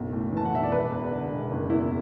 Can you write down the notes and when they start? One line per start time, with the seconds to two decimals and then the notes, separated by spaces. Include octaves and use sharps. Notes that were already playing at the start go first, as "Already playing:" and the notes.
Already playing: F#1 B1
0.13 A2
0.32 E3 A5
0.45 F#5
0.52 B1 E5
0.63 D5
0.71 E1 B4
0.91 E2
1.11 D3
1.32 E1
1.51 F#1
1.70 E2 E4